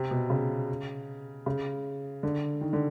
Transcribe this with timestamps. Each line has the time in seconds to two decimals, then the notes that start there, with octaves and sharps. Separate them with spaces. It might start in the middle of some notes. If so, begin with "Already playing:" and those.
Already playing: C3
0.11 B2
0.30 C#3
1.46 C#3
2.23 D3
2.61 D#3
2.73 D3